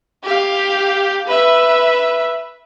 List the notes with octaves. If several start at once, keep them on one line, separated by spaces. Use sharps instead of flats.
G4 F5
B4 E5